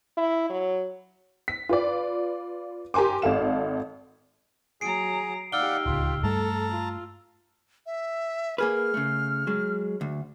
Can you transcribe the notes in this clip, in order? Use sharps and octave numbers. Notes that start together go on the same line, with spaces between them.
E4
F#3
B6
F4 B4 D5
G4 A#4 G#5 C6 D6
G#1 A4 F5 E7
F#3 G#4 A#5 C7 D7
D#4 G4 D5 F5 F#5 E6 F6 G7
D1 C#2 F4
G2 G3 A3 A4 A5 A#5
F4
E5
A#3 G#4 B4 F6
C#3 A3
F#3 G#3
D2